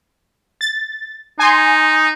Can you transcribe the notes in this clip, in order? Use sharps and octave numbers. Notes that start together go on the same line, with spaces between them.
A6
D#4 G#5 C6